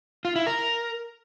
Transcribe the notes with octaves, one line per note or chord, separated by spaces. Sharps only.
F4
E4
A#4